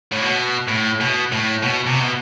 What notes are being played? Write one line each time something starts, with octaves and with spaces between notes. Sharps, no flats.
A2
B2
A2
B2
A2
B2
C3
B2